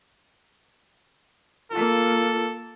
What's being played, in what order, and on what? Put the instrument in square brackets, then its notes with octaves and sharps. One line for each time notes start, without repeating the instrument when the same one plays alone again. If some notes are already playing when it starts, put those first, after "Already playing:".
[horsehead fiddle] A#3 F4 [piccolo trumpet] A4